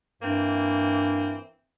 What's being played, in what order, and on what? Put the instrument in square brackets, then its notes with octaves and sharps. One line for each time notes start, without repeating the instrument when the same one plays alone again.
[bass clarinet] G2 [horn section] E3 A#3 C4